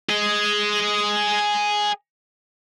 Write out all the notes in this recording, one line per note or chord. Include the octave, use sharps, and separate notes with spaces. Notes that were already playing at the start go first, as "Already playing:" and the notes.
G#4 D#5